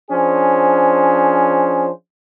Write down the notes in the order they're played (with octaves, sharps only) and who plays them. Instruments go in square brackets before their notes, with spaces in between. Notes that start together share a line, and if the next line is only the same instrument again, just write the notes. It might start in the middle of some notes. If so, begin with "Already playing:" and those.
[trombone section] F3 C#4 D4 G#4 C5